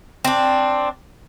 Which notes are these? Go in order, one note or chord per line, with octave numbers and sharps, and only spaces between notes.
C4 D4